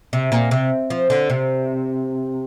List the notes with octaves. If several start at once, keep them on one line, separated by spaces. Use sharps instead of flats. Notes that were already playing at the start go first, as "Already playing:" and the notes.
C3
A#2
C3
F3
D3
C3